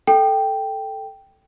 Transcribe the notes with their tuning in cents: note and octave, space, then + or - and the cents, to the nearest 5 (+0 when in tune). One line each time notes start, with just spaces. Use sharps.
A4 +0 G5 +0